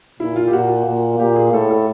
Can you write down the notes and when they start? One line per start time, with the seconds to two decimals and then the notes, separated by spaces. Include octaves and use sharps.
0.20 A#2 E4
0.36 F4
0.47 G4
0.53 A#2 F#4
0.86 A#2
1.19 A#2 G4
1.36 G#4
1.52 A2 A4
1.70 A4